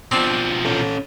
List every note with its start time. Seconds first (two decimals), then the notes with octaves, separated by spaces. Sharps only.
0.11 B2 F3 C4 D4
0.65 C#4 A4